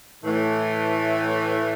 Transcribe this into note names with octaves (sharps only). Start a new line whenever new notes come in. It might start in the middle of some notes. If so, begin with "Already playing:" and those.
A2 E3 A3